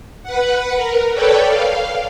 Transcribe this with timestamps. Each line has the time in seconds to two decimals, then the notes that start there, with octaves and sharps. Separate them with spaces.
0.23 B4 F#5
0.76 A#4
1.14 A4 B4 C#5 D5 G5
1.46 F5